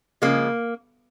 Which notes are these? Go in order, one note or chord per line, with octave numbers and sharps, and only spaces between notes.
C#3 F3 G#3 A#3